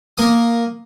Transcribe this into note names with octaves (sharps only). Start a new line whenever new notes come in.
A#3 D#6